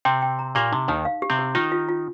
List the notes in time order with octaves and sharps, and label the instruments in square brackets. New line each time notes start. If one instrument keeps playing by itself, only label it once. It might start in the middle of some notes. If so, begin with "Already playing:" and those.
[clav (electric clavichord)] C3 C4 [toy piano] G5
[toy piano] G5
A#5
[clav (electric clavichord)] A#2 A#3 [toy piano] G4
[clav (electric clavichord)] C3 [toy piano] D#4
[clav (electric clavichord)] D#2 D#3 [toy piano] D#4
[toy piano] F5
G4
[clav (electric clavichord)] C3 C4
[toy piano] G4
[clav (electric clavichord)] D#3 D#4 [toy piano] F4
[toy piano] F4
F4